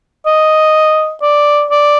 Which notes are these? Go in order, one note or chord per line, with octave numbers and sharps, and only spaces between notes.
D#5
D5
D5